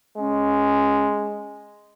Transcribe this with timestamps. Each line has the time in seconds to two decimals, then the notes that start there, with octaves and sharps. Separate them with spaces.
0.18 G#3 C#4